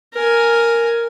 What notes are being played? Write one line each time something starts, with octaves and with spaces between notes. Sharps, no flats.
A#4 G#5